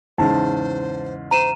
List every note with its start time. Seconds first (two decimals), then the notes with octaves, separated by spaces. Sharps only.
0.18 E2 G#2 C#3 C5 A5
1.31 C5 A#5 D#7 E7